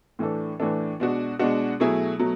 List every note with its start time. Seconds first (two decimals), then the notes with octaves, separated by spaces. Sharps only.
0.19 A2 E3 A3 D4 A4
0.60 A2 E3 A3 D4 A4
1.00 B2 G#3 D4 F#4
1.39 B2 G#3 D4 F#4
1.80 B2 F#3 A3 E4 G#4
2.19 B2 F#3 A3